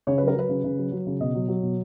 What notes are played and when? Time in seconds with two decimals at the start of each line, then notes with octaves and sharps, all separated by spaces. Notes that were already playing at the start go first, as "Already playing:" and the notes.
0.07 C#3 C#5
0.18 F#3 B4
0.28 A#4
0.35 F#3 B4
0.49 C#3
0.64 C#3
0.78 F#3
0.92 F#3
1.07 C#3
1.20 B2 D#5
1.35 F#3
1.48 F#3
1.63 B2